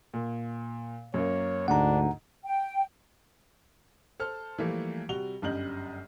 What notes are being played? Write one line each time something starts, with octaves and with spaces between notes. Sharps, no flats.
A#2
F#2 A#3 C#5
D2 G#2 D4 F#5 A#5
G5
A4 C5 A5 F6
E3 F3 G3 A3 A#3
C3 G3 F#4 F7 G7
G1 F#2 G3 D#5 G6 F#7